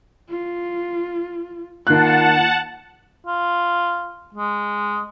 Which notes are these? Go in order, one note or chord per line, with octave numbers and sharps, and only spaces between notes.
F4
D#3 A#3 F4 F#5 A5 F#6
F4
G#3